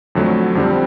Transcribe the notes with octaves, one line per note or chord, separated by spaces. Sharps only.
F2 D3 F#3 A3
F2 D3 G3 C4